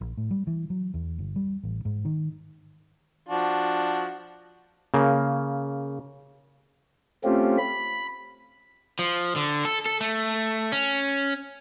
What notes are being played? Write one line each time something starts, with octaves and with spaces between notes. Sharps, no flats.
A#1
A2
G3
E3
F#3
E2
G1
G3
A1
G#2
D#3
F3 D4 F#4
C#3 A#3
A3 C4 C#4 F4 G4
B5
F3
D3
A4
A4
A3
C#4